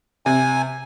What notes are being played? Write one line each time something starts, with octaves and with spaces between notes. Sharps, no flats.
C3 G#5